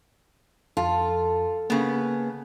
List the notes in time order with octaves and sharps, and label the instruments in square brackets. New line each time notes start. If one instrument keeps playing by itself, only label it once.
[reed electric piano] F2 [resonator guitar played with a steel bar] F4 [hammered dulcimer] A4
[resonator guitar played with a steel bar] C#3 B3 [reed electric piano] A#3